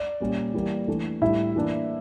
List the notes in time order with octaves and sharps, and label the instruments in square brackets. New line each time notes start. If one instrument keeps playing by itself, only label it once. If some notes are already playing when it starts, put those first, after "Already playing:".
Already playing: [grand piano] D5
A#2 G3 C#4
E3 G3 A#3
E3 A3 D4
A2 G3 D4 E4 E5
E3 A#3 D4